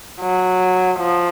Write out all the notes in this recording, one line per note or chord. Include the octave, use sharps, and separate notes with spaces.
F#3
F3